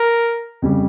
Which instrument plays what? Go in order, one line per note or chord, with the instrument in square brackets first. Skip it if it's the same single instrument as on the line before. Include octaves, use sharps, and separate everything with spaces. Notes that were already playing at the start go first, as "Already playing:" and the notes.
Already playing: [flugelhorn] A#4
[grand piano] F2 C#3 G3